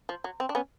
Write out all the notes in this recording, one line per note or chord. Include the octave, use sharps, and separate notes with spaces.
F3
F#3
C4
D4
B3 C#4